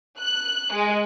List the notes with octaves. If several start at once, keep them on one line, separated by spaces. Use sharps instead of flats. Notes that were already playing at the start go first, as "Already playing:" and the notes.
F#6
G#3